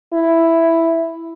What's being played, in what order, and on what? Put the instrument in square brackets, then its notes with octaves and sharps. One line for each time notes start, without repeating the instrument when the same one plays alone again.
[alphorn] E4